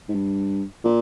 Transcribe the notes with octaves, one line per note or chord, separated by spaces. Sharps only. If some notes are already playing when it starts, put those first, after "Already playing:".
G#2
G2
A#2